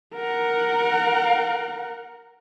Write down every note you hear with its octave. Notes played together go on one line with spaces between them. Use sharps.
A#4 F#5